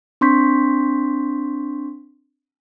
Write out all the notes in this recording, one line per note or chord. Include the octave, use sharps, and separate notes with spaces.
C4 D4 C6 C#6 G6 B6